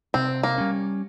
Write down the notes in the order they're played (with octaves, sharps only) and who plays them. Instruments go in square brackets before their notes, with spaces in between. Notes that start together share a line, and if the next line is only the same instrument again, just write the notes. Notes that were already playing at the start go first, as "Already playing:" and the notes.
[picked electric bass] C3 [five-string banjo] C4
[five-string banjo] A#3
[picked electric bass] G3 C#4